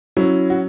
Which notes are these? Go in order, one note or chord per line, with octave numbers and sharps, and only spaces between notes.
F#3 C#4 E4
F#4